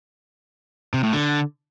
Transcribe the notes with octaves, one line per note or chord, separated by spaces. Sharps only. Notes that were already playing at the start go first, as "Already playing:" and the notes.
C3
A2
D3